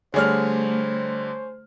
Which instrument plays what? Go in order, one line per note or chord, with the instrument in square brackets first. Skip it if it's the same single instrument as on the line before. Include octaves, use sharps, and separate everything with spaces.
[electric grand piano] D3 G3 [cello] A3 [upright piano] G#4 C#5 F6 [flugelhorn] C5